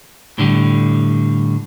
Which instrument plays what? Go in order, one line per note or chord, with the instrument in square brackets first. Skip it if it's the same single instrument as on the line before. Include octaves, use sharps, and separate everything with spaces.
[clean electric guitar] A2 D3 G3